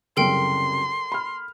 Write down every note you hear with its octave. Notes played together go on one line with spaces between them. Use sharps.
C2 F#2 C#3 A4 A#4 G5 C6
B5 F6